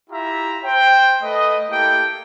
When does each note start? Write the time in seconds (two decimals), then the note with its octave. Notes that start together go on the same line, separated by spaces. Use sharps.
0.10 E4 F4 G4 E5 A#5
0.64 C5 G5
1.22 A3 B4 D#5
1.70 A#3 E4 G4 A4 G5